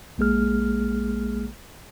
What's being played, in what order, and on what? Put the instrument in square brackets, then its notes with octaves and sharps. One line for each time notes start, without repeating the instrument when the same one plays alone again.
[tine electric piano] A#1 G#3 A#3 G#4 F6